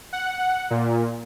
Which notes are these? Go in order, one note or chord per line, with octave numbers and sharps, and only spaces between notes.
F#5
A#2